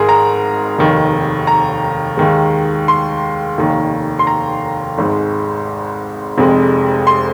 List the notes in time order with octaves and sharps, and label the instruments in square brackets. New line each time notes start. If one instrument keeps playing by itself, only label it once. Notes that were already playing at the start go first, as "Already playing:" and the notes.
Already playing: [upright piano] G#1 G#2 G#3 G#4 A#4
A#5
F1 D#2 D#3
A#5
D#2 D#3 G#3
C6
F1 D#2 D#3 A#3
C6
A#5
G#1 G#2 G#3
F1 F2 C3 G#3
C6